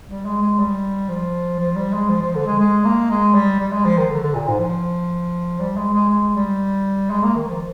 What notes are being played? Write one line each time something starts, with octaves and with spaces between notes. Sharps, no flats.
G3
G#3
G#3
G3
F3
F3
G3
G#3
F3
F3
D3
G#3
G#3
A#3
G#3
G3
G3
G#3
F3
D#3
D3
D3
A#2
G#2
F3
G3
G#3
G#3
G#3
G3
G#3
A#3
D#3
F3